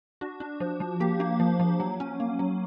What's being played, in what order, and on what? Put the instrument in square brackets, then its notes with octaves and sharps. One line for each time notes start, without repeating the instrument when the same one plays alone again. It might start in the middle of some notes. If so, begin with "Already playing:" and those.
[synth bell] D4 F#4
D4
F3
F3
A#3 G4
A#3
F3
F3
F#3
C#4
A#3
F#3